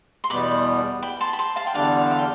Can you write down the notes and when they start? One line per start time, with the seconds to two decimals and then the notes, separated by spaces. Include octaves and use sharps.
0.24 C6
0.30 E2 B2 G3 B3 B5 D6
1.03 G5 B5
1.21 A5 C6
1.33 B5
1.39 A5 C6
1.56 F5 A5
1.67 G5
1.74 E2 D3 G3 D4 D5 F5
2.11 F5
2.19 G5